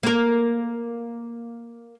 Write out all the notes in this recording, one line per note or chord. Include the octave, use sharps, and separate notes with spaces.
A#3 A#4